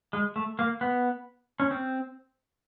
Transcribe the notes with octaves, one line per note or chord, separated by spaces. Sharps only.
G#3
A3
A#3
B3
C#4
C4